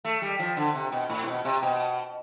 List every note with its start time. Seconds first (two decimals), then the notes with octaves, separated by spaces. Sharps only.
0.05 A3
0.22 G3
0.39 F3
0.57 D3
0.74 C3
0.92 B2
1.09 A2
1.23 C3
1.28 B2
1.45 C3
1.63 B2